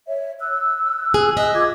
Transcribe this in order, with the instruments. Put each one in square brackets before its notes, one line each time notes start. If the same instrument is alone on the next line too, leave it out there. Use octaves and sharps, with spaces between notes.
[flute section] C#5 E5
E6 F#6
[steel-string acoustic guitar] G#4
[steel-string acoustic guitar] D#5 E5 [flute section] F#6
[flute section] F4 D6 G#6